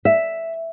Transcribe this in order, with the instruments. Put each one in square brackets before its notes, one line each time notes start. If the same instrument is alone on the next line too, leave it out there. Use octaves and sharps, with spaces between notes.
[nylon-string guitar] E5